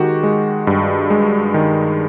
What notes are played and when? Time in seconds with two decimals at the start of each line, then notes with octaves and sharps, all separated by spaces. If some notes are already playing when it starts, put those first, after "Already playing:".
Already playing: D#3 G#3 F#4 G4
0.24 G#3
0.67 G2
1.10 G#3
1.54 D#3